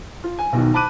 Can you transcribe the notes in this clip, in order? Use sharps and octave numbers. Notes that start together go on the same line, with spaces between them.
F4
G#5
B1 B2 D#3
A5 B5 D6 F#6 D#7